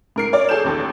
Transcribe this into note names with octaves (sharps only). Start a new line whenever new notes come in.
G#2 A#4 C7
A#4 C#5 D5
G#4 A4 C#5 G6 E7
A1 D#2 A4